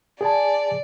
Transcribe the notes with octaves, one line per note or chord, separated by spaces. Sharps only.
G#4 D5 G#5 A5